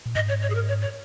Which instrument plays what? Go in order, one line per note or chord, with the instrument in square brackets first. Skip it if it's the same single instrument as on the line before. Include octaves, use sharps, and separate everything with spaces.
[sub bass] A#2
[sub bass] G#2 [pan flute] D#5
[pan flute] C#5
C#5
G#4
A#4
C#5
C#5